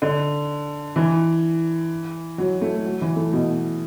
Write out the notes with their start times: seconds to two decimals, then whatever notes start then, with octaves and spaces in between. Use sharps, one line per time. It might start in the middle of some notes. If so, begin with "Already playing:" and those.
0.02 D3
0.96 E3
2.38 F#3
2.62 A3
2.85 F#3
3.01 E3
3.16 A3
3.33 B2